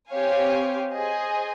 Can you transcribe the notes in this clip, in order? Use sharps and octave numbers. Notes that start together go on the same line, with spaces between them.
C4 G4 C#5 F5 G#5
G#4 C5 D#5 G#5